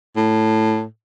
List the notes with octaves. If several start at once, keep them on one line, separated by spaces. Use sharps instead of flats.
A2